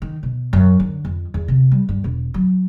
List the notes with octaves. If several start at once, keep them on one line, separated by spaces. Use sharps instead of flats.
D#3
B2
F#2
D3
F2
E2
C3
G3
G2
E1
F#3